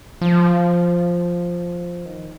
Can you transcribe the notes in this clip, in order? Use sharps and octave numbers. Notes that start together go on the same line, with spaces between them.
F3
D#3